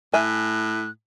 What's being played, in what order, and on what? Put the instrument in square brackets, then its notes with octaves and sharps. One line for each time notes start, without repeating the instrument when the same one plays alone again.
[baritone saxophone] A2 [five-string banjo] E5 G#5 [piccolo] F#6